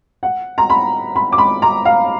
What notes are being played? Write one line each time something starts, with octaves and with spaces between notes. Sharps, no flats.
F#5
A#5
B5
B5
D6
B5
A#5
F5